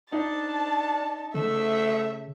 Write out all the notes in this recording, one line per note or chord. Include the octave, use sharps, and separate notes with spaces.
D4 D#4 A5
C#3 A3 E5